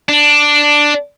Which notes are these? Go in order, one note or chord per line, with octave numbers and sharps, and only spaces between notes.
D4